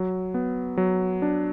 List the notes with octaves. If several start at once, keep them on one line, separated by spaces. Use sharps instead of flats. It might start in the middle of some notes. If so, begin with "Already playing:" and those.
Already playing: F#3
B3
F#3
D4